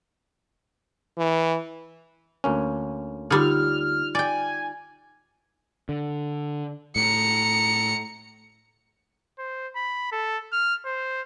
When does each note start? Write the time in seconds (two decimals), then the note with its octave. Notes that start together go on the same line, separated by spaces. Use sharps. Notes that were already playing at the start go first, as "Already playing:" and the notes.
1.18 E3
2.44 D2 A#3 C#4
3.31 D3 G3 D#4 F4 F6
4.15 D5 G5 G#5
5.89 D3
6.96 A2 A#5 C#7
9.38 C5
9.76 B5
10.12 A4
10.52 F6
10.85 C5